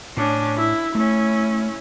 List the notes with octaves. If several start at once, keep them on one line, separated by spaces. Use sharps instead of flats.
A2 C#4 D4
E4
A3 C#4 E4